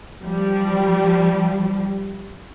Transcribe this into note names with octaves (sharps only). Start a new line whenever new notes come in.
F3 G3